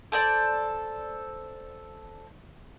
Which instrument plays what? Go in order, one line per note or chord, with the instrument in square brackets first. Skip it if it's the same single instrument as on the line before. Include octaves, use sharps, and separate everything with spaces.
[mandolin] A4 C5 D5